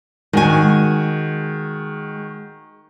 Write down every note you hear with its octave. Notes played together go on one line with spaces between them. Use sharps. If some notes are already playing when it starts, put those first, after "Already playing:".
D#3 G#3 F#4 G#5